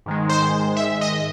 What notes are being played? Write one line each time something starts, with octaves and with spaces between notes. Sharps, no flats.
G#2 D#3 G#3
C5
E5
D#5